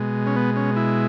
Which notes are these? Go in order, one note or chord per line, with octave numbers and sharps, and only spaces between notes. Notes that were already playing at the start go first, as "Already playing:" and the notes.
Already playing: B2 G#3
C#4
B3
C#4
E4